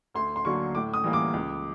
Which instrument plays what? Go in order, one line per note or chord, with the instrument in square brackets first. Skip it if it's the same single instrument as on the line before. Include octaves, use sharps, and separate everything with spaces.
[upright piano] D2 C6
C6
D3 F#3 A#3 C#6
A2 D6
D#6
E3 G3 A#3
D6
C#2